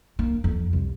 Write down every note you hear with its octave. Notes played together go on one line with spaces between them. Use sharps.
A#3
F2
C2